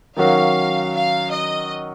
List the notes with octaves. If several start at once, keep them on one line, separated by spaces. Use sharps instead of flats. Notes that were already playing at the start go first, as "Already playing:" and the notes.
D#3 F#3 C#4 F#4 A#4 F5
F5
D#5